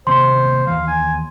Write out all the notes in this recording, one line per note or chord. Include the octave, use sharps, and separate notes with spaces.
D#1 C3 A#3 C5 C6
D#2 E3 F5
G#5